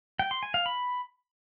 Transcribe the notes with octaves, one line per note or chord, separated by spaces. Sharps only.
G5
C6
G#5
F5
B5